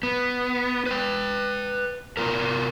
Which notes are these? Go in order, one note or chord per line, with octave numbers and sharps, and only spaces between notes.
B3
B4 G5
B3 F4 A#4